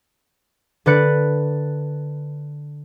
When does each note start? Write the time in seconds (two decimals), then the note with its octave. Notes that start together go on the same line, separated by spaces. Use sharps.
0.86 D3 B4 D5 F#6 C#7